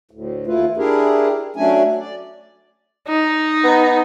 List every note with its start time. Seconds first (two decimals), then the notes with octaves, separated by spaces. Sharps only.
0.11 D2 A2
0.47 D#2 A3 E4 F4 B4
0.77 D4 E4 G4 G#4 A#4
1.56 F#3 A3 C#4 D4 G#5
1.99 D5
3.08 D#4
3.64 B3